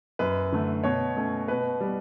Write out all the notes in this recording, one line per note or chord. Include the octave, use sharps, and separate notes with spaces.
F#2 B4
D3 A3
B2 C#5
A3 C#4
B2 B4
G3 B3